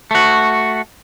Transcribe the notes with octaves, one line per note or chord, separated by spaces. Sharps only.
A3 F#4